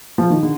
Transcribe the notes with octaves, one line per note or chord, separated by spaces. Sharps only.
F3
D#3
D3